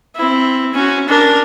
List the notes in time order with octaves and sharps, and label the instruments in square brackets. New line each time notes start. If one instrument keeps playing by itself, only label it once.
[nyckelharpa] C4 E4
C#4 F#4
D4 A#4